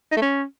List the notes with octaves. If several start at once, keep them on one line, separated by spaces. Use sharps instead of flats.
D#4
A3
C#4